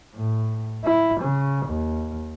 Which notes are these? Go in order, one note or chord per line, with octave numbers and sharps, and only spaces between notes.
A2
E4
C#3
D#2